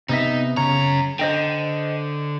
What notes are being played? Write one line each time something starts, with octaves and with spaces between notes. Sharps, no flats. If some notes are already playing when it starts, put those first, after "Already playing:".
C3 B3 D#4 E5
F#2 C#3 C#5 A#5
D3 C5 D#5 G5